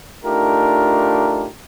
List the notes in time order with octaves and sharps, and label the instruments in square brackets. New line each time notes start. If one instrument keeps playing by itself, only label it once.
[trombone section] A3 D4 D#4 F4 G4 A#4